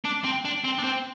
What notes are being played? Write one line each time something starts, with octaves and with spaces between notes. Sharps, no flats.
D4
C4
D4
C4
D4
C4